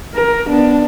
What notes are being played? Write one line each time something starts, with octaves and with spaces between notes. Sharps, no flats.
A#4
B3 D4